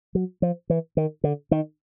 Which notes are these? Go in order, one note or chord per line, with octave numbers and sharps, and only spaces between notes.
F#3
F3
E3
D#3
D3
D#3